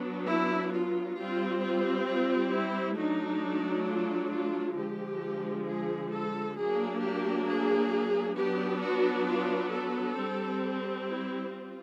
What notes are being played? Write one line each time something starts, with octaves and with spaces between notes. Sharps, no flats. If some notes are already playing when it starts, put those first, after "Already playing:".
Already playing: F#3 B3 D4
E4
F4
G3 C4 F4
F4
F4
E4
F#3 A3 D4 D#4
F4
F4
D3 F3 G#3 G4
G#4
A4
F#3 A#3 D4 G#4
G4
G#4
F#3 B3 D4 G4
F#4
F4
A4
G3 C4
E4
F4